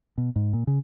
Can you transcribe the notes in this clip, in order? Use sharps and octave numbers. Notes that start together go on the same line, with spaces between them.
B2
G#2
A#2
C#3